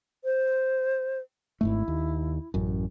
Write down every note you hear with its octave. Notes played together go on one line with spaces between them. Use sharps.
C5
G#1 G#2 A3 E4
D#2
A1 F#2